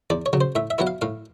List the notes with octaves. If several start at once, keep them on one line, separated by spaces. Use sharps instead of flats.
E2 D5
C#5
C#3 F#3
C5
A2 E5
E5
F#3 B3 E4 F#5
F5
A2 F5